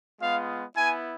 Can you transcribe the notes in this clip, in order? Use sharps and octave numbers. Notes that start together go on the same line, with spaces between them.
G#3 B3 F4 F5
B3 E4 G#5